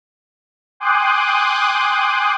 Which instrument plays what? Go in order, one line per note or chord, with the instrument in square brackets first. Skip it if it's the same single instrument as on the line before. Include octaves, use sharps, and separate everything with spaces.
[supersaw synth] G5 G#5 C6 D6 D#6 F#6